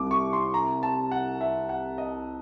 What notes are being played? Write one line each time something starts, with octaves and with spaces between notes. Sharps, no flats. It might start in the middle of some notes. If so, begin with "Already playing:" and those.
Already playing: C2 D6
C#6
C6
A#5
A5
F#5
E5
F#5
D#5